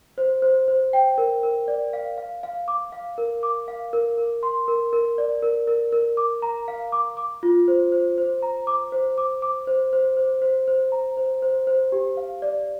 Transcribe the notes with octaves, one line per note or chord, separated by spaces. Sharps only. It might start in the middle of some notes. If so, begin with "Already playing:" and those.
C5
C5
C5
G5
A#4
A#4
D5
F5
F5
F5
D6
F5
A#4
D6
F5
A#4
A#4
C6
A#4
A#4
D5
A#4
A#4
A#4
D6
A#5
F5
D6
D6
F4
C5
C5
C5
A#5
D6
C5
D6
D6
C5
C5
C5
C5
C5
A#5
C5
C5
C5
G4
F5
D5